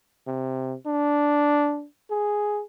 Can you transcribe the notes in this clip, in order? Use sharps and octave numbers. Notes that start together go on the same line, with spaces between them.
C3
D4
G#4